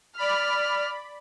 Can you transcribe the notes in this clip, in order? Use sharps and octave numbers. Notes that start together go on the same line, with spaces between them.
D5 B5 F6